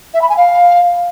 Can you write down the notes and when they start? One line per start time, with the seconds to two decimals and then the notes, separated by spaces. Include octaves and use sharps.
0.13 E5
0.21 B5
0.29 G#5
0.36 F5